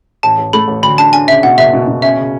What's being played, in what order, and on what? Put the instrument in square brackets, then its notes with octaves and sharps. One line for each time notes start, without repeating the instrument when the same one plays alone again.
[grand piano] A1 [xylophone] A5
[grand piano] A1
[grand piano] A3 [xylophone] B5
[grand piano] A1
[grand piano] D2 [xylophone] B5
[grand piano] D4 [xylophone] A5
[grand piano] D4 [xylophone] G#5
[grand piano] C#3 [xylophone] E5
[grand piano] B2 [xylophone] F#5
[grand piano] F#1 [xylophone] E5
[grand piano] B2
B2
[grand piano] C#4 [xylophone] E5
[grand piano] C#3